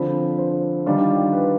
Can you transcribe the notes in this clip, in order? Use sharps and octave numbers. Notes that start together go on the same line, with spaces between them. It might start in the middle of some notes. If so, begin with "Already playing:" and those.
Already playing: D3 F3 C4 B5
C5
D#3 G3 D4 F4
B4